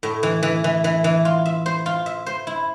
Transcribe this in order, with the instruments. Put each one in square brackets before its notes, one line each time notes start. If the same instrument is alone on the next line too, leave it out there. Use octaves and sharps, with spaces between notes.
[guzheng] A2
E3
E3
E3
E3
E3
F4
E5
C5
F4
E5
C5
E4